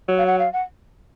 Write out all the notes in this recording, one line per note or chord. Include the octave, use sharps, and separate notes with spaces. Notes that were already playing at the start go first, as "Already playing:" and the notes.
F#3
F5
F#5
F5
F#5